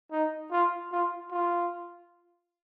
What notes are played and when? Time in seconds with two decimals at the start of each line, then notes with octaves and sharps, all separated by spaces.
0.11 D#4
0.51 F4
0.92 F4
1.32 F4